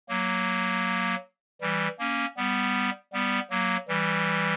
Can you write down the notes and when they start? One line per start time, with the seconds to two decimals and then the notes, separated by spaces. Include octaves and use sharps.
0.09 F#3 A#3
1.61 E3 G3
1.99 A#3 C#4
2.37 G3 B3
3.13 G3 B3
3.50 F#3 A#3
3.88 E3 G3